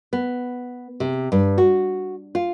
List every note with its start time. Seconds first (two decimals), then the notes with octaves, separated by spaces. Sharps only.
0.13 B3
1.00 C3
1.32 G2
1.58 F#4
2.35 F4